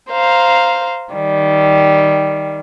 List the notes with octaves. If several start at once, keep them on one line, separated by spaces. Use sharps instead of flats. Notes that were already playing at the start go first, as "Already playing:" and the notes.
C5 F5 A#5
D#3 G3